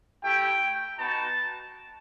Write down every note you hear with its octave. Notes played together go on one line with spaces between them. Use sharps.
A3 E4 G4 G5
B3 D#4 F#4 A5